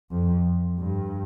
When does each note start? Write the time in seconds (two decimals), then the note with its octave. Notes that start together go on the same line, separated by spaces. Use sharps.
0.11 F2
0.79 G2